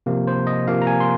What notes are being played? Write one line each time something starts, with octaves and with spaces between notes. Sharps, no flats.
C3 F3 A#3
C5
D#5
C3 F3 A#3 F5
A#5
G#5
C6